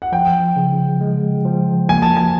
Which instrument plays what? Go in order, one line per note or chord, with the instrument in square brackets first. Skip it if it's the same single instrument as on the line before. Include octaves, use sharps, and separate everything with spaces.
[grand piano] F#5
[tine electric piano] F3 [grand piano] G5
[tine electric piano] C#3
G#3
F3
[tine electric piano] A#3 [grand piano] G#5
[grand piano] A5
G#5